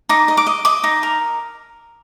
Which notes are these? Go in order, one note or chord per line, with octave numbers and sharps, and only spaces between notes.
D#4 D6
D#5
D6
D#5
D#5 D6
D#4
A#4